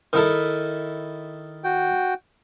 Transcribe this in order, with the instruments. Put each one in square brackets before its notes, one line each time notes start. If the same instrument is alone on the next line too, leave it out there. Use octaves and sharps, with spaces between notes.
[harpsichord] D#3 E4 A4
[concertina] F#4 G5